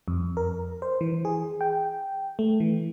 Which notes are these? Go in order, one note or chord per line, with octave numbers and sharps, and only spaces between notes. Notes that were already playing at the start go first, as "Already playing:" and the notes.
F2
A#4
C5
E3
G#4
G5
A3
E3